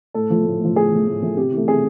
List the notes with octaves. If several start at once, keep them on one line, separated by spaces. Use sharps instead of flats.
A2 A4
F3 A3
A2
F3 A3
A2 G#4
F3 A3
A2
F3 A3
C3 G4
E3
A3
C3 G#4